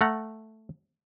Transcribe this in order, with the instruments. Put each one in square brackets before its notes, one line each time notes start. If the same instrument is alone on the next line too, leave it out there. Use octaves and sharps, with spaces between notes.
[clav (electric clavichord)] A3 F#5 A#5